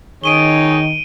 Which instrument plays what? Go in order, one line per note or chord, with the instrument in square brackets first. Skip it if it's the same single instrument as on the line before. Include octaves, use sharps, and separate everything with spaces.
[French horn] D#3 [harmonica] D#4 G#4 C#5 [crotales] D7 D#7 G7